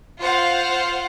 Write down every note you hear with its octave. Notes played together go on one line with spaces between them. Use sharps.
F4 C5 F5 F#5